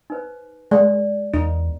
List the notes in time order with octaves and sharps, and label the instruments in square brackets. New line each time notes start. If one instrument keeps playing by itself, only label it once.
[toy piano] D#4 B4 C5
[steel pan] G#3 [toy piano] D5
[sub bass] E2 [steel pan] D#4